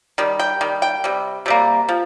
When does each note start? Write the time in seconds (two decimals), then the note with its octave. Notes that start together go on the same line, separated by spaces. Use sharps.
0.18 D#3 G3
0.39 G5
0.61 D#3 G3
0.82 G5
1.04 C3 G3
1.46 C3 G3 A#3
1.89 F3